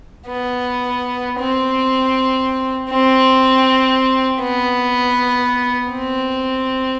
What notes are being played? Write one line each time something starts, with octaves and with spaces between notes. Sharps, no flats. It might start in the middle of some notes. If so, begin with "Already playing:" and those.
B3
C4
C4
B3
C4